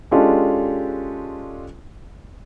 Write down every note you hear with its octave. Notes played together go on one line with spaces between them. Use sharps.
G#3 C#4 D4 F4 G4 A4